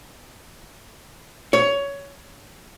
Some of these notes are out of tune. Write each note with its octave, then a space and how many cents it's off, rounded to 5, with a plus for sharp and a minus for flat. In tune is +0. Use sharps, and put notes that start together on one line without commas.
C#5 +15